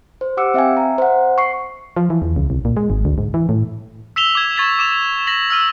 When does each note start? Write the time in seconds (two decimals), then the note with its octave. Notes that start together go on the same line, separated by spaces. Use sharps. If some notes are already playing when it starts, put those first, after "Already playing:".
0.21 C5
0.37 G4 F#5 D6 E6 C#7
0.54 C4 E5 F5 G5 G#5
0.77 E5 A#5
0.98 C5 F#5
1.38 C#6 C7
1.96 F3
2.10 E3
2.22 E2
2.36 C#2
2.50 C2
2.65 A#2
2.77 G#3
2.90 G#1
3.05 D2
3.18 G#2
3.34 E3
3.49 A2
4.16 E6 B6 E7 F7 G7
4.35 D6 G#6
4.56 C#6 G#6 A6 B6 F7 G7
4.79 D6 E7 F7
5.27 A#6 B6 F#7
5.50 E6 F6 D#7